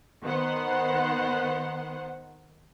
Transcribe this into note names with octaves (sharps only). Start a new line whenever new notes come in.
D#3 B3 C5 F#5